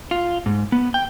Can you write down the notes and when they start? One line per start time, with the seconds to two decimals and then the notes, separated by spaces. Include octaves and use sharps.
0.11 F4
0.46 G#2
0.72 B3
0.94 G5